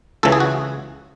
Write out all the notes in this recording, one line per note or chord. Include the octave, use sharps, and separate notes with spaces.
C#2 C#3 E3 A4
G#4
F#4